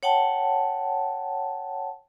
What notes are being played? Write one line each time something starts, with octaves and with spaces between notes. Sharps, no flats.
C#5 F#5 G5 A5